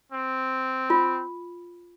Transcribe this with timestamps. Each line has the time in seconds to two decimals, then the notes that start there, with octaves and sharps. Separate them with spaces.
0.12 C4
0.90 F4